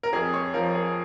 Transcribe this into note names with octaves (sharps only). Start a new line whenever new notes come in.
A#4
F2 G#4
C#5
F3 A#4
G#4